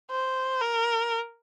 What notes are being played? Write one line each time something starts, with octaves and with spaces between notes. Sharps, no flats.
C5
A#4